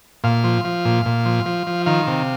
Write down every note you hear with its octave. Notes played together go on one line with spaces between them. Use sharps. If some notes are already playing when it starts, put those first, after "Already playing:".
A#2 F5
F3
F3
A#2
A#2
F3
F3
F3
D#3 F5
C3